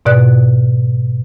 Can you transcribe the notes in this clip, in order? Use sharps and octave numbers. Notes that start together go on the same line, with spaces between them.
G#2 B2 D5 F#6